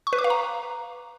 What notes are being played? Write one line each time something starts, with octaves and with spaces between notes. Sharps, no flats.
C#6
B4
D6
F5
A#5